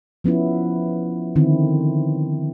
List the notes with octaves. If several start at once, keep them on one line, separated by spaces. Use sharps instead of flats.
F3 B3 C#4 E4
D3 D#3 C4 E4